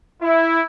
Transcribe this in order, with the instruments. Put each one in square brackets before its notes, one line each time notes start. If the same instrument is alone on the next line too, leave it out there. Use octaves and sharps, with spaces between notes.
[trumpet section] E4